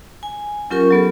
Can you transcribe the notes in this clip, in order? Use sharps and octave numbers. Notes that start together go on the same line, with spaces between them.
G#5
F#3 C#4 F4 G4 A#4 C#6
F#3 B3 A4